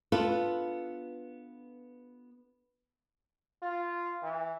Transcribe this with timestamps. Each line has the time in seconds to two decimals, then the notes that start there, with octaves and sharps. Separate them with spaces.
0.12 B3 D4 F4 A4 B4
3.62 F4
4.23 E3